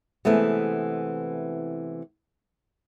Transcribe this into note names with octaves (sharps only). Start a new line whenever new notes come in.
C3 E3 G#3 A3 B3